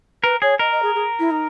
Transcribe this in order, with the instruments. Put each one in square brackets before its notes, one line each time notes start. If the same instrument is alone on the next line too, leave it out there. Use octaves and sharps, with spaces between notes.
[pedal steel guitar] A#4 [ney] B4
[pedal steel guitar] G#4 [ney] C#5
[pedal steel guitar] A#4 [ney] D#5
[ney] D#5
G#4
G#4
E4
D#4